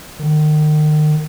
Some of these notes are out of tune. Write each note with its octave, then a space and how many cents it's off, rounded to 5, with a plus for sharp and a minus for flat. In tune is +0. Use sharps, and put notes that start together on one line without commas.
D#3 -35